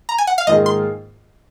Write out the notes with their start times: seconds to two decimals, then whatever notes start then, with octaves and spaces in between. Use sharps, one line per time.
0.09 A#5
0.18 G#5
0.27 F#5
0.38 F5
0.47 G#2 D#3 A#3 F4 G#4 D#5
0.66 C6